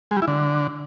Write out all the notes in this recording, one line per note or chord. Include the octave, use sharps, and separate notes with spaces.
G#3
G3
E4
D3